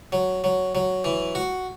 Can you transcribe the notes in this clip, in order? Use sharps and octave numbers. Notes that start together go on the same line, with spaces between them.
F#3
F#3
F#3
E3
F#4